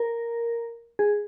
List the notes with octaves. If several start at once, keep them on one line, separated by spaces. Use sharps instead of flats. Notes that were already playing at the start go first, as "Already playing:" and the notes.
Already playing: A#4
G#4